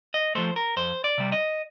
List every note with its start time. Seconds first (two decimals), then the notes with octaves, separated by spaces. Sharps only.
0.14 D#5
0.35 F3 A3 C5
0.56 A#4
0.77 F2 C5
1.04 D5
1.18 C3 G3
1.32 D#5